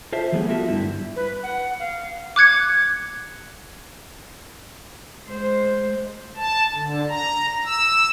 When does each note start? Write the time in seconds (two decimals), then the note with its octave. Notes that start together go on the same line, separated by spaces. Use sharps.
0.12 F4 A4 C5 E5
0.32 E3 F#3 G3 A3 B3 G#4
0.48 B3 F4 F#4 A4 A#4 E5
0.68 G2 D3 G3 E4
1.16 B4
1.43 F#5
1.80 F5
2.36 D6 F#6 G#6 C#7
5.27 G#3 C5
6.36 A5
6.74 D3
7.09 A#5
7.65 E6